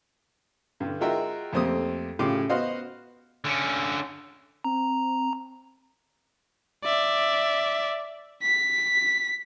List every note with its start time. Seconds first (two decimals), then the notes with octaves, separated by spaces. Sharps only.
0.80 G2 D3
1.01 G#3 F4 F#4 A#4 E5 G5
1.53 F2 A3 A#3 C4 G4 D#6
2.19 A2 C#3 F4 G4 C6 D6
2.50 B3 F#4 C5 D#5 F5
3.45 D3 C#4
4.64 C4 A#5
6.84 D5 E5
8.43 B6